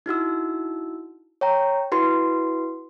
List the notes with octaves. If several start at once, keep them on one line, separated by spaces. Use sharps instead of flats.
D#4 E4 F#4 E6
C#5 G5 A#5
E4 F#4 B4 C6